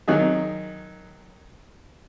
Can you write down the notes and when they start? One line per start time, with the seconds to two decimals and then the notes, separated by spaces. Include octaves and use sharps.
0.08 D#3 F#3 D#4 G#4